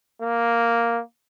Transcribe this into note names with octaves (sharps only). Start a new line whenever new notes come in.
A#3